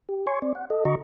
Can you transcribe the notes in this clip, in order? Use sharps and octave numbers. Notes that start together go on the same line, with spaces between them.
G4
C#5 G#5 C6 C#6
C4 D5
F#5
A4 D#5
D3 F#4 D#5 A#5 C#6